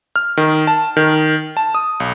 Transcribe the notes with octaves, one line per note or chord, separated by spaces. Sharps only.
F6
D#3
A5
D#3
A5
D#6
B1